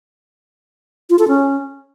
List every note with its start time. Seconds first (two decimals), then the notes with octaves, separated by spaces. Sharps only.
1.10 F4
1.19 A4
1.28 C#4